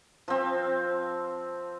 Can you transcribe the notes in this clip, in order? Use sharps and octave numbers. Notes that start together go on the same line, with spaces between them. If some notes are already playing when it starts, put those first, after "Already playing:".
F3 C4